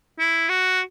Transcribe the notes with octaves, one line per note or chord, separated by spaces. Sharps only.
E4
F#4